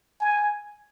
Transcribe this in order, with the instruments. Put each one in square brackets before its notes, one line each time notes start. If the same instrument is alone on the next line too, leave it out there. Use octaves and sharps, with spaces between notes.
[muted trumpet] G#5